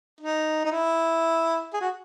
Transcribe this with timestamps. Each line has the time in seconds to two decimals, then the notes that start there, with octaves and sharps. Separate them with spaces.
0.21 D#4
0.65 D#4
0.72 E4
1.74 G#4
1.81 F#4